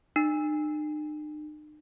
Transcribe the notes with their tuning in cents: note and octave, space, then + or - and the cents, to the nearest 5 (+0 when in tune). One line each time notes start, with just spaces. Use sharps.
D#4 -45